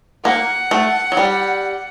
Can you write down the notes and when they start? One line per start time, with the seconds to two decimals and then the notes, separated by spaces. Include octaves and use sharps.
0.25 A#3 F#5
0.71 A3
1.12 F#3
1.17 G3